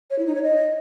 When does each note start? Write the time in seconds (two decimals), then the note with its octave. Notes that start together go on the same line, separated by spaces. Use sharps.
0.11 C#5
0.19 E4
0.27 D#4
0.35 C#5
0.43 D#5